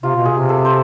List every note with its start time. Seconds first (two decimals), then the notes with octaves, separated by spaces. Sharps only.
0.02 C3 F4
0.16 B2
0.25 C3 G#4
0.49 A4
0.65 C5